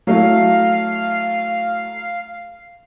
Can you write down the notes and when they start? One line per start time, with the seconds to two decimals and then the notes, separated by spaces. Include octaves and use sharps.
0.07 F#3 A3 E4 F5